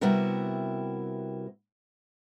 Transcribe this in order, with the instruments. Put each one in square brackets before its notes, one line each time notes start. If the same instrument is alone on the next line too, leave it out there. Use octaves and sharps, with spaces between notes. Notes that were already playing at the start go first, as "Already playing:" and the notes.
[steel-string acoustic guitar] C3 G3 B3 E4 F#4 A#4